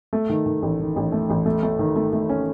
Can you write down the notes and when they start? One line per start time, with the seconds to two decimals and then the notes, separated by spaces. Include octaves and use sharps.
0.13 A3
0.29 D#3
0.46 D#3
0.62 A1
0.80 D#3
0.96 A1
1.12 A3
1.30 A1
1.46 A3
1.63 A3
1.79 D#3
1.96 A3
2.13 A3
2.29 C#4